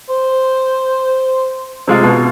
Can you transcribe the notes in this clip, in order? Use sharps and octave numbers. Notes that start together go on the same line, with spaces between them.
C5
C3 G#3 F4
B2